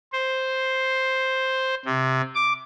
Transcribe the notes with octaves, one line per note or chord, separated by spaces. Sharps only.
C5
C3
D6